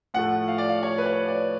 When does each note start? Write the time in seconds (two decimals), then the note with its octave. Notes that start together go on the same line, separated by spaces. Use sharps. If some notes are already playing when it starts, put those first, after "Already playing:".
0.14 A2 F3 A3 F#5
0.48 F5
0.58 D5
0.69 F5
0.83 C#5
0.98 B4
1.06 C#5
1.28 D5